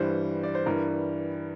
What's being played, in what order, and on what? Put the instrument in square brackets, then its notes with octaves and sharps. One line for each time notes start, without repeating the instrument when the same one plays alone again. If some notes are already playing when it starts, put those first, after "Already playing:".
Already playing: [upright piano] G2 E3 G3 C5
D5
C5
G2 E3 G3 A#4